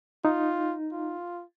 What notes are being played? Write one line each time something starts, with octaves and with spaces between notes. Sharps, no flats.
D#4 F4
F4